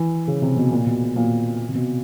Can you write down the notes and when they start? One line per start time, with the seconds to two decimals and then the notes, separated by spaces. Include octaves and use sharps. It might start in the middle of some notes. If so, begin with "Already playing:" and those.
Already playing: E3
0.27 C#3
0.42 C3
0.57 B2
0.71 A#2
0.86 B2
1.16 A#2
1.69 C3
1.75 B2